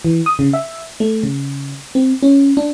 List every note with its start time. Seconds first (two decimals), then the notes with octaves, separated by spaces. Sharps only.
0.04 E3
0.26 D#6
0.39 C#3
0.53 E5
1.00 A3
1.23 C#3
1.95 C4
2.23 C#4
2.57 D4